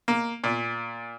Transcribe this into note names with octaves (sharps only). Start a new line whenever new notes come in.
A#3
A#2